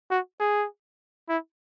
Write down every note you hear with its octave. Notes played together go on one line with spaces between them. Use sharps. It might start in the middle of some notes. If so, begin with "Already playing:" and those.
F#4
G#4
E4